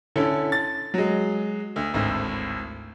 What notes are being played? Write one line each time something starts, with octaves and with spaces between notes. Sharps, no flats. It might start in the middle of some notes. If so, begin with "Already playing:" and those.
D3 C#4 E4 A4
A6
F#3 G#3
D2
G#1 D2 A2